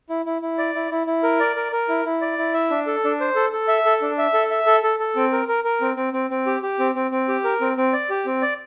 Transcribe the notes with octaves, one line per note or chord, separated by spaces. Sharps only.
E4
E4
E4
D5
E4
E4
E4
A#4
D5
A#4
A#4
E4
E4
D5
E4
E5
D4
A4
D4
C5
A4
A4
E5
A4
D4
E5
A4
E5
A4
A4
A4
C4
A#4
A#4
A#4
C4
C4
C4
C4
G4
G4
C4
C4
C4
G4
A#4
C4
C4
D5
G4
C4
D5